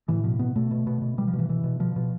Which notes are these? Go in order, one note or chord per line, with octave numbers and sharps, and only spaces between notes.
A2 E3
B2 F3
B2 B3
B2 A3
B2
B2
B2
B2 G3
F3
B2
E3
B2 E3
B2
B2 F3
B2